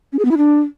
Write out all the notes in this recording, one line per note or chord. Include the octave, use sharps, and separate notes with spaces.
C#4
G#4
B3
E4
D4